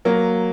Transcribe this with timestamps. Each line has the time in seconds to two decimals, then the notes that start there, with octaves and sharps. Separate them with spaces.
0.05 F#3 A#3